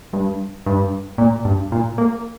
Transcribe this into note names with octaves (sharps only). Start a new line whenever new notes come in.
G2
G2
A#2
G2
A#2
A#3